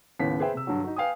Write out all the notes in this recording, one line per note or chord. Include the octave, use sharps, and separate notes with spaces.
D#2 A2 C#3 B3 B6
G#4 B4 C5 E5 G5
C3 E6
G2 D3 F#3
D#4 F#4
B4 F5 G5 G#5 D#6